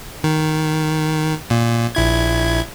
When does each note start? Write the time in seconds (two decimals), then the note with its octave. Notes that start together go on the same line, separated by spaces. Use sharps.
0.24 D#3
1.50 A#2
1.95 A#1 E4 G#6